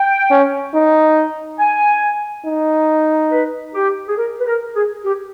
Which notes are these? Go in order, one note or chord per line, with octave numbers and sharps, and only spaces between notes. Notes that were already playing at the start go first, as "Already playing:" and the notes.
Already playing: G5
C#4
D#4
G#5
D#4
B4
G4
G#4
A#4
B4
A#4
G#4
G4